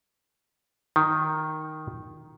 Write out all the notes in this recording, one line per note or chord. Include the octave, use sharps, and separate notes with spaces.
D#3